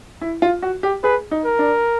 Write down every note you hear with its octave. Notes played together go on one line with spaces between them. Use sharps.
E4
F4
F#4
G4
G#4 B4
D#4
A#4
D4